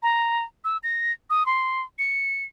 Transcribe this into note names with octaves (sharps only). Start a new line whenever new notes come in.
A#5
E6
A#6
D#6
C6
C#7